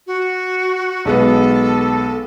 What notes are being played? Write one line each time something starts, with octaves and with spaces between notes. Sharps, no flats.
F#4
B1 G#3 B3 A4